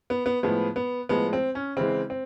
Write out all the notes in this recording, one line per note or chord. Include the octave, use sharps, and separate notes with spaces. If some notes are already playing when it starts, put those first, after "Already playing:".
B3
B3
A2 F3 G#3 B3
B3
A2 F3 G#3 B3
C4
C#4
C#3 E3 G#3 C4
C4